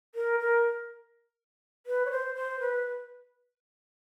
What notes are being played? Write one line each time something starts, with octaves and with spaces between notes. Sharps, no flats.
A#4
A#4
B4
C#5
C5
C5
B4